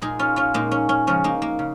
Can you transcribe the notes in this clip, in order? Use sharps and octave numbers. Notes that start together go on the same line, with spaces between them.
A#2 G#3 D#4 G#4
C#4 F4
C#4 F4
A#2 G#3 A#3 D#4
C#4
C#4
C#3 F3 G#3 C#4
A#3 D#4
A#3
C#3